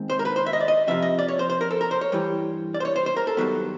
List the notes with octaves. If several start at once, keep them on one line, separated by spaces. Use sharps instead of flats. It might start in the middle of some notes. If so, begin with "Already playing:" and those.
Already playing: G#2 D#3 G#3 C4
C5
A#4
B4
C5
E5
D#5
D5
D#5
F2 C3 F3 E5
D#5
D5
C#5
C5
C5
A#4
A4
A#4
C5
C#5
G2 E3 G3
D5
C5
C#5
C5
C5
A#4
A4
G2 D#3 F#3 B3